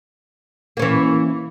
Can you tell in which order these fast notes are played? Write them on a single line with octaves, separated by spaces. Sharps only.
A#3 C#4 E3